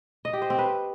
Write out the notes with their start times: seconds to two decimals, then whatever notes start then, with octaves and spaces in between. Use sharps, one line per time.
0.25 D#5
0.33 G4
0.42 C5
0.50 C4
0.59 B4